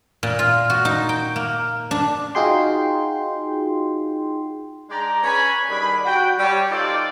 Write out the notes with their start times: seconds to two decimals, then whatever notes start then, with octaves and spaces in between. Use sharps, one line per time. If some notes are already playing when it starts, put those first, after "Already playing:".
0.23 A#2
0.39 F4
0.70 F#4
0.85 D#4
1.09 G5
1.36 A#3
1.91 D4
2.35 D#4 F4 F#4 G#4 G5 C6
4.90 G#3 D4 D5 G5 A#5
5.24 C#4 B4 C#5 G#5 B5
5.69 D#3 G3 D4 G#4 B5
6.05 F#4 G5
6.39 G3 C#5
6.71 D#4 F4 A4 C5 D5